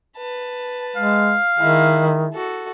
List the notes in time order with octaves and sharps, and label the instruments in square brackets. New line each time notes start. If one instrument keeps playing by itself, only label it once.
[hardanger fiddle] B4 A5
[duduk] G#3 [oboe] F5
[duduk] D#3 [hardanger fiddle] G#3 E4
[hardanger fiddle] F#4 A4